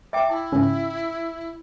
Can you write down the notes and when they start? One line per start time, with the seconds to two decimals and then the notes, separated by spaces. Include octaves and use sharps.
0.13 E5 G5 D6
0.30 E4 A5
0.52 G#2 C#3 C#4